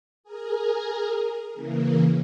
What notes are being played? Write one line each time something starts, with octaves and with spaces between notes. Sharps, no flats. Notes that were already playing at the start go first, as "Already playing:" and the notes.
G#4 A#4
C#3 E3 A#3